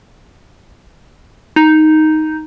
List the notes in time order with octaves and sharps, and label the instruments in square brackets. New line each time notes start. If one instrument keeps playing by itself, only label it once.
[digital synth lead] D#4